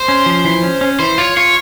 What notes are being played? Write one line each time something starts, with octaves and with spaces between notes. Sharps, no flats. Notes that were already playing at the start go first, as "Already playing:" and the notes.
Already playing: C5
C#4
F3
E3
C#4
C#4
E3 C5
F4 C#5
F4 C#5